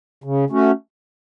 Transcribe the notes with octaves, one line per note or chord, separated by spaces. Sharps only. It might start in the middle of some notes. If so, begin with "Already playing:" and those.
C#3
A3 C#4 F#4